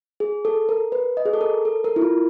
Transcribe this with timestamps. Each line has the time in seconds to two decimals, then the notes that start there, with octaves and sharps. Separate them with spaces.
0.20 G#4
0.45 A4
0.69 A#4
0.92 B4
1.17 D#5
1.26 G#4
1.33 A4
1.41 A#4
1.65 A4
1.84 A#4
1.96 E4
2.02 F4